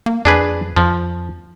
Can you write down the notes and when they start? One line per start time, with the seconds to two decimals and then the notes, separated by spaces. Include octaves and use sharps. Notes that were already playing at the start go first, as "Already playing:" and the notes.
0.06 A#3
0.25 F2 D4 G#4 B4
0.76 F2 F3